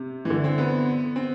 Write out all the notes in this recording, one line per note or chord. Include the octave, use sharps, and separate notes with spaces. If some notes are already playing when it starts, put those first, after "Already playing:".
Already playing: C3
E3
D3
C4
B3
C4